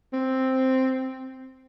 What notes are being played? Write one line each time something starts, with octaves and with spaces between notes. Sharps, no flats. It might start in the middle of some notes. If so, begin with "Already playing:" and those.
C4